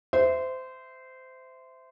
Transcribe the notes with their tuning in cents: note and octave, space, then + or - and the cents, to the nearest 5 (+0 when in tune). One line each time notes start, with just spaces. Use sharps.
C5 -20 E5 +0